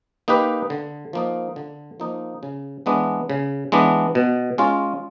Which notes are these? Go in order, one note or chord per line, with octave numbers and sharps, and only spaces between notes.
A#3 D#4 G4 B4
D3
F3 A#3 D#4
D3
F3 A#3 D#4
C#3
E3 G#3 B3 D4
C#3
E3 G#3 B3 D4
B2
G#3 C#4 F4